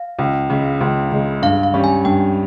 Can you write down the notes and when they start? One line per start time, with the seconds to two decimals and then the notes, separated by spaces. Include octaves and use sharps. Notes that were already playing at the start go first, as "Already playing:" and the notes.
Already playing: F5
0.19 C#2
0.50 C#3 G#3
0.81 C#2
1.12 C#3 G#3
1.42 G2 F5
1.63 F5
1.74 G3 C#4
1.84 G#5
2.05 G2 G5